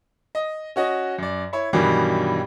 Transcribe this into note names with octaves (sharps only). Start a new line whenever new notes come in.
D#5
C#4 F#4 D#5
F#2 D5
E4 C#5
G2 B2 D#3 E3 F#3 G3